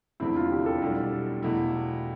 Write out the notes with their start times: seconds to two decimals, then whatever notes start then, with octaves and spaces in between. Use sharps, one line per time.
0.20 F1 E2 D3 A3 C4 E4
0.36 F4
0.51 G4
0.66 A4
0.82 B1 B2 G3 D4
1.43 E2 B2 A3 E4